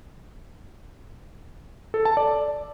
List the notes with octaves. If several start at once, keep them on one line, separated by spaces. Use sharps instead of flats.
A4
A5
D5